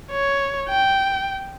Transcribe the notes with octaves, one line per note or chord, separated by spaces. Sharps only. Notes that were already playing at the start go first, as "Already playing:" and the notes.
C#5
G5